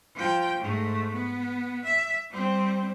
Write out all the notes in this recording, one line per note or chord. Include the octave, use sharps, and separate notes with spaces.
F3 G5
G#2 A3
B3
E5
G3 C4